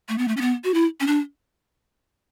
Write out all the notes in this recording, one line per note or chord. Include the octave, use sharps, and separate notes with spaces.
A3
B3
A3
C#4
B3
F#4
E4
C#4
D4